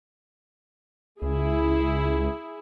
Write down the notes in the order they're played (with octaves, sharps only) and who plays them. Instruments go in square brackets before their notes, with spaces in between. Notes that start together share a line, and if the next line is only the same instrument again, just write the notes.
[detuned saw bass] C#2 [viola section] E4 G#4